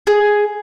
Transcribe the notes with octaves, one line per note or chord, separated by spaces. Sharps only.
G#4